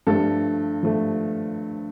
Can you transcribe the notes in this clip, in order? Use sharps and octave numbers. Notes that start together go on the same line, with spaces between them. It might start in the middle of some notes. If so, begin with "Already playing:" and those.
G2 F3 A3 A4
F3 A3